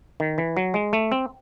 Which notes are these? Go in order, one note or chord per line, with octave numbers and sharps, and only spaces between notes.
D#3
E3
F#3
G#3
A3
C4